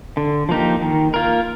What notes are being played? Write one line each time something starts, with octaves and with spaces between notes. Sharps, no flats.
D3
F3 A#3 D#4 G4
D#3
A#3 F4 A#4